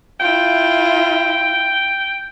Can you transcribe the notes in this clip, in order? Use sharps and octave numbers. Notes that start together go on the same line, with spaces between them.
E4 F4 G5